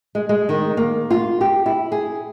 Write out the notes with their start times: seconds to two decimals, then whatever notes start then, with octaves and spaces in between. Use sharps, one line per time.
0.15 G#3
0.29 G#3
0.49 D#3
0.77 A#3
1.11 F4
1.41 G4
1.66 E4
1.92 G#4